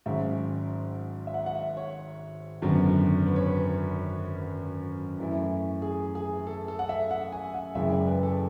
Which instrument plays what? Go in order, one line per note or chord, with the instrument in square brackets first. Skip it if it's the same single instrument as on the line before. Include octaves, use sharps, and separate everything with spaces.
[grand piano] G#1 G#2 F#3 C#4 E5
E5
F#5
F#5
E5
C#5
G#1 F#2 D3 F#3 B3
B4
C#5
B4
F#2 E3 A3 E4
G#4
G#4
A4
A4
F#5
E5
F#5
G#5
F#5
F#1 F#2 C#3 E3 G#3 E5
D5
B4
A4